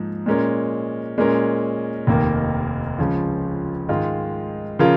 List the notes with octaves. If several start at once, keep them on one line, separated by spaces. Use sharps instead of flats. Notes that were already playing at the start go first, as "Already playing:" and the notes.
Already playing: G#2 F3 A#3 D#4
A#2 G#3 C#4 A#4
A#2 G#3 C#4 A#4
F1 D#2 D#3 A#3
C#2 C#3 F3 C#4 F4
G#2 D#3 G#3 F4
C#3 F3 C#4 F4 A#4